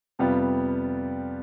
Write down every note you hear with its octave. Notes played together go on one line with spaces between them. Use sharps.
F2 C3 G3 B3 F4